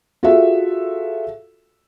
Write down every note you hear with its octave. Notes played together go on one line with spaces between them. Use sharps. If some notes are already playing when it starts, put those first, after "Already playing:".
F4 F#4 G#4 A4 E5